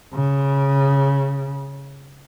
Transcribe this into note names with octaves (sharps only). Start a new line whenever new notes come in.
C#3